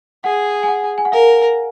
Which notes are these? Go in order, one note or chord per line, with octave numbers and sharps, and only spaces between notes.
G#4 F#5
G#5
F#5
G#5
F#5
A#4 F5